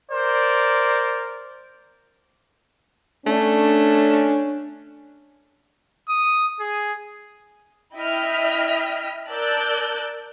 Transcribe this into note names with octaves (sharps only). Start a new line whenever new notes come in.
A#4 C5 D5
A3 C#4 D4
D#6
G#4
E4 D#5 E5 G5 F6 B6
A#4 D5 A5 E6 F#6 G6